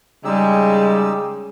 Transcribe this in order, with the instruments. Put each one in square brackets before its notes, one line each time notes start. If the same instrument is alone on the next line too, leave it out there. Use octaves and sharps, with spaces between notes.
[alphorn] C#3 [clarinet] G3 [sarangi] G#3 [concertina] D#4 G4 E6